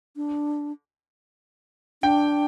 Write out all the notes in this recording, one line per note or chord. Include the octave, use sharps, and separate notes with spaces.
D4
D4 G5